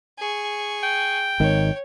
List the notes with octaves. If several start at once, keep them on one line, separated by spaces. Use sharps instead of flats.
G#4 C#6
G5
G#1 D#3 C#5